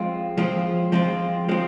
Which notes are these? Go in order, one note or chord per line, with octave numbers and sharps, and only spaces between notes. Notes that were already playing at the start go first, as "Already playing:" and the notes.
Already playing: F3 G#3 C4 F4
F3 G#3 C4 F4
F3 G#3 C4 F4
F3 G#3 C4 F4